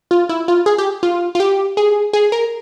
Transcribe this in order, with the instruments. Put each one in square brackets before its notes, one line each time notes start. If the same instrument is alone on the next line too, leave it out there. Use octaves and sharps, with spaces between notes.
[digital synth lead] F4
E4
F4
G#4
G4
F4
F4
G4
G#4
G#4
A#4